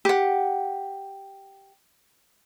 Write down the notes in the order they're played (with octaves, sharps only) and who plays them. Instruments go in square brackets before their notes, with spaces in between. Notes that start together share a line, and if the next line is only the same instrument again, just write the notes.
[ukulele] G4 F#5